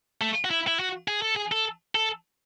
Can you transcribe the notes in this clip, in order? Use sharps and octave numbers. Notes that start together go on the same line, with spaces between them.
A3
F#4
E4
E4
F#4
G#4
A4
G#4
A4
A4